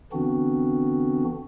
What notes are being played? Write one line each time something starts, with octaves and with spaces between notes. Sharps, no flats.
D3 E3 B3 C4 D4 F#4